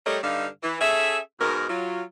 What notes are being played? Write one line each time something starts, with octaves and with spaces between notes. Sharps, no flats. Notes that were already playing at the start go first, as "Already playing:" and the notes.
G3 A3 G4 A#4 C#5 D#5
G2 D3 D#4 F5
E3
C#4 G#4 A4 E5
G#2 B2 A#4
F#3 F4